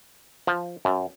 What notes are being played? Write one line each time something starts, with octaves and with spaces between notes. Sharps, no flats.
F3
F#2